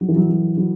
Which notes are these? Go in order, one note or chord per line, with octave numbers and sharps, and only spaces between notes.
F#3
E3
F#3
F#3
F#3